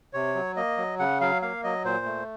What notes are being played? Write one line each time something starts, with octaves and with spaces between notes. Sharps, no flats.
C3 C#5
F#3
A#3 D#5
F#3
C#3 F#5
F#3 F5
A#3 F5
F#3 D#5
A#2 C5
A3